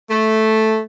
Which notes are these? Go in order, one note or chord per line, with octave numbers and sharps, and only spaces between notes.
A3